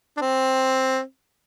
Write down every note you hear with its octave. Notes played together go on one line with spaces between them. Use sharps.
D4
C4